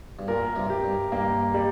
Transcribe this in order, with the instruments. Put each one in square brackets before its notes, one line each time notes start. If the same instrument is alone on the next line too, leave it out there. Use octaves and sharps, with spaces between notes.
[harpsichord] G2
[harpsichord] A#2 [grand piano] A#4
[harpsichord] G2 C3
[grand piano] G4
[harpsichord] G2
[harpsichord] G2 [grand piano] A#3
[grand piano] G3